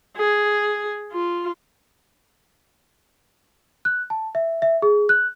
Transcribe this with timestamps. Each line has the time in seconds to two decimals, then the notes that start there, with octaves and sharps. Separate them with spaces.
0.17 G#4
1.12 F4
3.85 F#6
4.10 A5
4.35 E5
4.62 E5
4.82 G#4
5.09 F#6